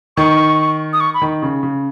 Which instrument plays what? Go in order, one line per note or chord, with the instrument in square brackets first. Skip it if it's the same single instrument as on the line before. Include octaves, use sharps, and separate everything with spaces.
[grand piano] D#3 [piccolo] C#6
[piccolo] D#6
C#6
B5
[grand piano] D#3
C#3
C#3